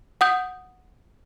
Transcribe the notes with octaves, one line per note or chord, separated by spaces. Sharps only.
F#5 D#6 G6